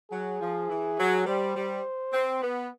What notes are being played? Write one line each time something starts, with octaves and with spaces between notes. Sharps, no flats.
F#3 G#4
F3
E3
F#3
G3 C5
G3
C4
B3 B4